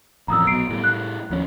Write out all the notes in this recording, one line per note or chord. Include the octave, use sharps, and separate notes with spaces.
A1 F2 A#5 D#6 E6
B1 B2 C7 D7
A2 C3 G3
F#6
D#2 F3 C#4